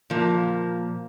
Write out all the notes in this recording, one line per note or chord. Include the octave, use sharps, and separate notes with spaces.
A#2 F3 A#3